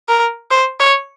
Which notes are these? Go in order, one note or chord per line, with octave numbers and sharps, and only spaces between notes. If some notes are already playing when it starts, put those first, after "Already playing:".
A#4
C5
C#5